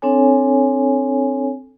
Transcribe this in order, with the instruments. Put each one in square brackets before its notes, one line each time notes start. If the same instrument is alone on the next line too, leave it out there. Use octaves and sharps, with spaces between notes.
[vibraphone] C4 D4 A4 C#5 G#5